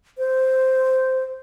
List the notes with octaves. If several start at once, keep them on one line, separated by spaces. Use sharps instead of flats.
C5